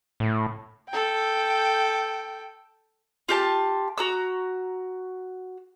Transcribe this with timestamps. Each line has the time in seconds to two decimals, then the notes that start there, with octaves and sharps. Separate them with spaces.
0.20 A2
0.89 A4 G5
3.29 F4 G4 A5
3.98 F#4 A#5 E6